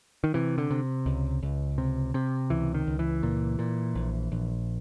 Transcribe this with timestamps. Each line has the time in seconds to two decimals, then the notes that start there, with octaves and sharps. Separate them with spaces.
0.24 D#3
0.34 C3 E3
0.58 D3
0.70 C3
1.06 C#2
1.43 C#2
1.78 C3
2.14 C3
2.50 C#2 E3
2.74 D#3
2.87 C#2
2.99 E3
3.23 A#2
3.59 A#2
3.95 A#1
4.32 A#1